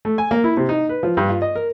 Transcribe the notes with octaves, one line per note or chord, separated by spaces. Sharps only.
A3
G#5
A#3
E4
C3
D#4
B4
F3
G2
F4
D#5
A#4